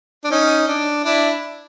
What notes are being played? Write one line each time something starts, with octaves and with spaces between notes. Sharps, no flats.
D4
C#4 D#4
D4
D4 E4